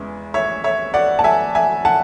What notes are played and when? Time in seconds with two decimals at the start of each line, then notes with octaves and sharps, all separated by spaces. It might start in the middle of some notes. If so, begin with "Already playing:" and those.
Already playing: E2 C#3 E3 G#3
0.34 C#5 E5
0.64 C#5 E5
0.94 D5 F#5
1.19 A5
1.24 E5 G#5
1.55 E5 G#5
1.85 F#5 A5